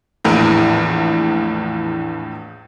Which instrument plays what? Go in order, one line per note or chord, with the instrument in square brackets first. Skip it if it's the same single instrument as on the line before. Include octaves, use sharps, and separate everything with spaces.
[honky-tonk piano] A#1 E2 A2